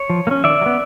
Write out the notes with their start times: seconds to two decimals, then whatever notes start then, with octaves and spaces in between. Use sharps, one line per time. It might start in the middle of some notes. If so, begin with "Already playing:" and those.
Already playing: C#5
0.10 F3
0.27 A#3
0.31 C#4
0.44 D#3 D5 E5
0.61 F#3
0.66 B3